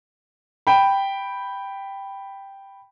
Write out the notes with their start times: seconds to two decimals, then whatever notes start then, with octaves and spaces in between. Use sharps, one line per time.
0.67 G5 B5